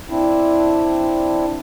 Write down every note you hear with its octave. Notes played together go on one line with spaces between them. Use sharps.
C4 D4 E4